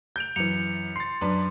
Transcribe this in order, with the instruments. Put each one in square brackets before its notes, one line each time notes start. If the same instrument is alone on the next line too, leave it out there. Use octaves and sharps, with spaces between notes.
[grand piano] G6 D7 F7
[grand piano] F#2 E3 [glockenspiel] C#7 F7
[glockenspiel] C6 [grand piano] A6 C7
[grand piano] F#2 D4 B4 [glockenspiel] C6